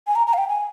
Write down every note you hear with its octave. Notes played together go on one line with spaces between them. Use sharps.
G#5
A#5
A#5
F5
G5
G#5